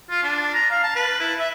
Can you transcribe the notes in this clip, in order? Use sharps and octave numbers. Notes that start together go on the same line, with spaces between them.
F4
D4
A#5
F5
A5
B4
E4
E5